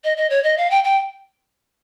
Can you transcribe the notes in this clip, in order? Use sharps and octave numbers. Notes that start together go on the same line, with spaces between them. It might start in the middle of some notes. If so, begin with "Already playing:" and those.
D#5
D#5
C#5
D#5
F5
G5
G5